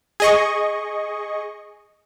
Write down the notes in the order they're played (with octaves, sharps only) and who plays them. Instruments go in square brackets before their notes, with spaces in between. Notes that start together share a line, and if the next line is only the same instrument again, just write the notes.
[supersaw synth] G#4 D#5 C#6